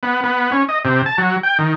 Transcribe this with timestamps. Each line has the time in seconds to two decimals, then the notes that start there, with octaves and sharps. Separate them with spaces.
0.03 B3
0.24 B3
0.52 C#4
0.69 D#5
0.85 C3
1.06 A5
1.18 F#3
1.43 G5
1.59 D#3